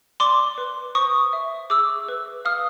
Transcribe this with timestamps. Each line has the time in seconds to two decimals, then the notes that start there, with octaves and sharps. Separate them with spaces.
0.20 D5 C6 D6
0.58 B4
0.95 C5 C#6 D#6
1.33 E5
1.70 G#4 D6 E6
2.09 B4
2.45 F5 D#6 F6